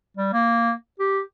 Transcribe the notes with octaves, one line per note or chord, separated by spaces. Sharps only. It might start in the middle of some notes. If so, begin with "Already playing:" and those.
G3
A#3
G4